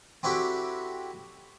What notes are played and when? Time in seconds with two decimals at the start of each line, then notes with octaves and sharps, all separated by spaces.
0.23 C4 D4 E4 F#4 G4 A4